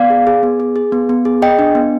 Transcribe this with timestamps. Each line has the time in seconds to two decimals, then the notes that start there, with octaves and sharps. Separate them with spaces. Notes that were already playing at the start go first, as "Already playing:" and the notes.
Already playing: B3 D5 F5
0.10 G#4
0.27 G#4
0.43 B3
0.60 G#4
0.76 G#4
0.92 B3
1.09 B3
1.25 G#4
1.42 G#4 D#5 G5
1.59 D4
1.75 B3